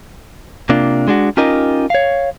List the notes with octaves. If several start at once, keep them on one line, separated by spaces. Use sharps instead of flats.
C3 A#3 D4 F4
G#3 D4 F#4
C#4 D#4 F4 G4 A#4 D#5
C#5 F5